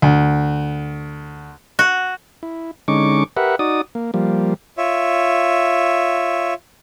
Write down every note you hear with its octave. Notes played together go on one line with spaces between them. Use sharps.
D2
F#4
E4
D3 G#3 C#4 D#4 C#6 D6
G4 A#4 B4 E5 F#5
D#4 F#4 D5 D#6
A#3
F3 G3 A#3
F4 C#5 E5